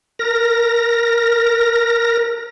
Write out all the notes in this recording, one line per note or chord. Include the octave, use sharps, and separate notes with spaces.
A#4 A#6